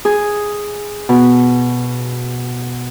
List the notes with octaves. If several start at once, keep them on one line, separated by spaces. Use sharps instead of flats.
G#4
B2